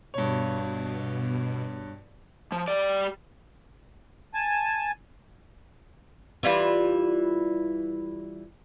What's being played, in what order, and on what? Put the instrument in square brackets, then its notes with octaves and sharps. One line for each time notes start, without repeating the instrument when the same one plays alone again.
[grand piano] G2 C#5 [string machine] B2
[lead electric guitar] F3
G3 D5
[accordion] G#5 A5
[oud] E3 G3 F4